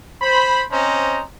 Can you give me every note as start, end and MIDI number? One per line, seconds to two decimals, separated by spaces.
0.21 0.64 72
0.21 0.64 83
0.71 1.23 60
0.71 1.23 61
0.71 1.23 72
0.71 1.23 75
0.71 1.23 82